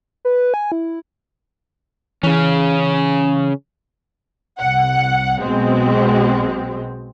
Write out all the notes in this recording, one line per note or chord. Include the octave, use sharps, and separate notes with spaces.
B4
G#5
E4
C#3 E3 C#4
C2 F#5
B1 B2 G#3 C4